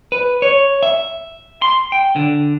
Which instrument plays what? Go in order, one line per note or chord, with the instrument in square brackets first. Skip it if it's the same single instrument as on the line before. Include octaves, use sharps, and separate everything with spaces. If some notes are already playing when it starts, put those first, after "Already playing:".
[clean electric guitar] B4
C#5
E5
C6
G5
D3